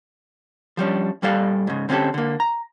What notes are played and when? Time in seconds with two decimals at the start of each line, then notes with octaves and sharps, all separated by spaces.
0.77 F3 G3 C#4 D4
1.22 A#2 G3 A4 D5 F5
1.67 G#2 C#3
1.89 D3 C4 C#4 D#4 G4 A4
2.14 D3 A#3
2.40 A#5